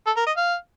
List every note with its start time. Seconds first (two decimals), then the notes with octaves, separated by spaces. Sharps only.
0.06 A4
0.17 A#4
0.26 D#5
0.37 F5